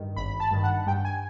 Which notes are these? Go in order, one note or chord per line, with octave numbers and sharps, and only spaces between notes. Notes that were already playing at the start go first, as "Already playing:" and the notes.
Already playing: G2 D#3
G#1 B5
A5
G2 D#3
F#5
G2 G5
G#5